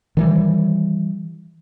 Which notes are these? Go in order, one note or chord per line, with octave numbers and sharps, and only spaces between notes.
D#3 E3 G3